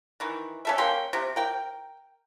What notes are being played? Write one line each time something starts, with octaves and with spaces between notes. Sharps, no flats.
D#3 E3
C#4 A4 E5
A#3 C#4 G5 C6
C3
A#4 G5